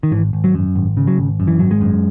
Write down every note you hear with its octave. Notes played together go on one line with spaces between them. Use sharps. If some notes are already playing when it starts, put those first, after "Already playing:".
D#3
G#1 E3
G#1
F#3
F#2
G#1
C#3
F#3
G#1
F#2
E3
G#1 F#3
G#3
F#2